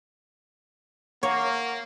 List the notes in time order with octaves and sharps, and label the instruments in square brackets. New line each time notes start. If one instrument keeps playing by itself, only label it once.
[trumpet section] A#3 [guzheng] C#5 [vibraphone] F#5